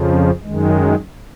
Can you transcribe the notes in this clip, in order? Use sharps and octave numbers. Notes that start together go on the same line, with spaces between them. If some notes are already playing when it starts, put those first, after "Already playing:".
Already playing: F2 C#3 F3
F#2 D#3 G#3